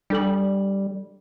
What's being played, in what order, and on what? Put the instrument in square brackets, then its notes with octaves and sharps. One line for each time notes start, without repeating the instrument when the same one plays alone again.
[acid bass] G3 [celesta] D4 A4 F#7